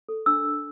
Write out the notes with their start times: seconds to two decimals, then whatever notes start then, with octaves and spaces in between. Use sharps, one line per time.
0.09 A4
0.26 D4 E6